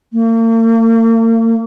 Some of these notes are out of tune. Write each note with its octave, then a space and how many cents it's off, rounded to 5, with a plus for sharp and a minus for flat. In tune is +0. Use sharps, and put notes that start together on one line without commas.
A#3 -45